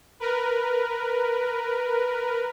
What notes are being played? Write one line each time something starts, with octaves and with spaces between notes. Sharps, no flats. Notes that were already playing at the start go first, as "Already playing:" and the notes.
A#4 B4